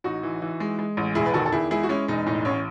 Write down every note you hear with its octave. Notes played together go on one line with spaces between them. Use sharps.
A1 D#4 F#4
E3
E3
G#3
G#3
A1
E1 E4 G#4
B4
D#3 F#4 A4
A4
E2 E4 G#4
G#3 E4 G#4
F#4
G#3 C#4 E4
E1 D#4
A2 D#4
A1 C#4